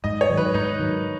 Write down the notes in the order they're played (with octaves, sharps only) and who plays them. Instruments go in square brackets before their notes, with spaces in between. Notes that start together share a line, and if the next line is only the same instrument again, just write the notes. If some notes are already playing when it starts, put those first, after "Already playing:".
[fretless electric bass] G#2 [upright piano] D#5
[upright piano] C#5
[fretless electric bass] D#3 F#3
[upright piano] B4
[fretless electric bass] G#2 [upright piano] D#4
[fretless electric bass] D#3 F#3